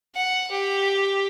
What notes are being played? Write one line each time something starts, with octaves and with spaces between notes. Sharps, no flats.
F#5
G4